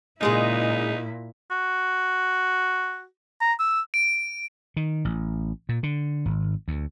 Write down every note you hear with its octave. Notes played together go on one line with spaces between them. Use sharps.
A#2 C#3 G#3 D#4 E4 G#4
F#4
A#5
E6
D7
D#3
A1
A#2
D3
G#1
D2